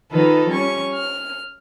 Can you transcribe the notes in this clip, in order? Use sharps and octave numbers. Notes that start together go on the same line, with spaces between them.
D#3 D#4 F4 A4 B4
G3 C#4 C#6
F6